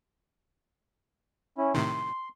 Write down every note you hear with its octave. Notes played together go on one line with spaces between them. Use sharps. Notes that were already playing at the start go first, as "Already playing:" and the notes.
C#4 E4
A2 C3 D#3 C6